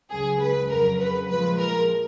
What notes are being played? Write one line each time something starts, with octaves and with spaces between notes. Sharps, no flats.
C#2 C#3 F#3 G#4
B4
F2 C#3 F#3 A#4
B4
A#2 F3 G#3 B4
A#4